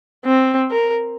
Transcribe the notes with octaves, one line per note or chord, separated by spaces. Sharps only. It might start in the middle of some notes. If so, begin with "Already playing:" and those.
C4
A#4